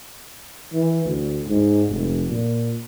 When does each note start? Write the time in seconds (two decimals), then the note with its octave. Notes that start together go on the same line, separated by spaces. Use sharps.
0.73 E3
1.05 D2
1.47 G#2
1.89 F1
2.29 A#2